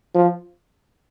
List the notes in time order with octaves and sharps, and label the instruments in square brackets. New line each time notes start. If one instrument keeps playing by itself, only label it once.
[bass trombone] F3